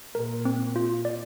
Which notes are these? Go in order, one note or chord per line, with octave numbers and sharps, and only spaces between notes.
A#2 A#4
C4
F4
D5